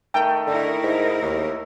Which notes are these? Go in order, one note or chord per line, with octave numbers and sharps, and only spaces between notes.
D#3 A3 G5
D3 D#4 E4 A#4
G#2
D#2